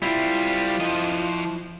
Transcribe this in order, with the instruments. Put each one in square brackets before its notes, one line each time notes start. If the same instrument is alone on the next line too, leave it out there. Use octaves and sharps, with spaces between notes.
[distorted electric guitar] G3 C4 [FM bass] E4 [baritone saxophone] F4
[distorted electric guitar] F3 D#5